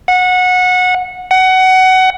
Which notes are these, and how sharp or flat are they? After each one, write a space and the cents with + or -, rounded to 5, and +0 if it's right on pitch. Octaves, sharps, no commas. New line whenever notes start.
F#5 -20
F#5 +20